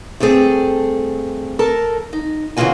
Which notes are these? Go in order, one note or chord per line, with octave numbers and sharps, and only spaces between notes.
G2 A3 C4 G#4 A4
A4 A#4 A5
D#4
C#3 E3 A#3 F4 F#4 G#5